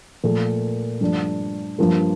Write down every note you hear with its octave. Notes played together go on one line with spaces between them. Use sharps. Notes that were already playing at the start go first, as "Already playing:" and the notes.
A#2 F3 A3
G2 F3 A3 D4
G2 F3 A#3